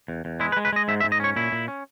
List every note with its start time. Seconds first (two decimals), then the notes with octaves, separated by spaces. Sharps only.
0.08 E2
0.25 E2
0.40 G#3 E4
0.52 B4
0.57 G#3
0.65 B4
0.73 G#3 D#5
0.88 G#2 E5
1.00 E5
1.04 G#2
1.12 D#5
1.20 C#4 C#5
1.36 A#2 E4
1.52 A#2
1.68 C#4